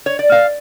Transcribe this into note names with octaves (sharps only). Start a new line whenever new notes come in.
C#5
D5
F5